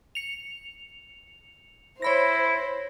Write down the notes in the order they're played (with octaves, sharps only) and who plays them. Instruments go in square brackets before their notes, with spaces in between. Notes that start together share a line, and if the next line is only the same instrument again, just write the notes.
[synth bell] C#7 F7
[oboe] E4 [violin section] C5 [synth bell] C#5 B5 A#6